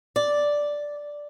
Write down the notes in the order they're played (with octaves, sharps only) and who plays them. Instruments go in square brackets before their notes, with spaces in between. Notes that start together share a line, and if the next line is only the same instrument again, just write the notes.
[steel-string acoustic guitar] D5